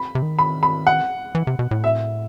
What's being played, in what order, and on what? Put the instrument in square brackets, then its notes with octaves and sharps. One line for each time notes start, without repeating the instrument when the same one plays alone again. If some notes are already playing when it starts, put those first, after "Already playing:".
Already playing: [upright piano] B5
[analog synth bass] C3
D#3
[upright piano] B5
B5
F#5
[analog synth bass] E3
C3
B2
A2
[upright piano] E5